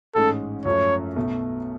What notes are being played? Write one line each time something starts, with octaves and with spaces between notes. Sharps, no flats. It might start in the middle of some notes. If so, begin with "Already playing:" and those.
A1 G#2 G#3 C#4 A4
F#2 F3 A3 C#4 C#5
B1 B2 A3